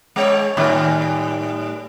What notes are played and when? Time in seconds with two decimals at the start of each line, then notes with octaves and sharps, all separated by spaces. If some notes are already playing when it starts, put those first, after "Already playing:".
0.16 G#3 C#5
0.57 A2 D#3 G3